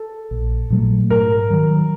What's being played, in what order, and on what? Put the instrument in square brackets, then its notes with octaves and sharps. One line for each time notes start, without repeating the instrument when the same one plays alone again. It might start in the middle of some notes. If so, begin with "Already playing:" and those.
Already playing: [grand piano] A4
[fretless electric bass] A#1
A#2 F#3 A3
[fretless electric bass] G#2 [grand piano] A#4
[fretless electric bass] D#3 F#3